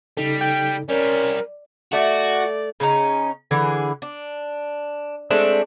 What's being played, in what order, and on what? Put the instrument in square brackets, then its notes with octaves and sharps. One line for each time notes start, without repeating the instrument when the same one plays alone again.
[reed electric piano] C#3 D#4 A4 [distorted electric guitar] G3
[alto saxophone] G5
[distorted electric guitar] G3 C5 [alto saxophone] C#4 [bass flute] A#4 [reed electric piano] D5
[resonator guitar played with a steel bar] A3 [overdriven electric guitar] F#4 [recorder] D5
[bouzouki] C#3 C#4 D#4 A#5
D3 E3 G#4
D4
G#3 A3 C4 D4